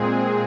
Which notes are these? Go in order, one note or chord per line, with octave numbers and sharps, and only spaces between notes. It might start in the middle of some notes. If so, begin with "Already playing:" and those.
Already playing: A#2 G#3 C4 G#4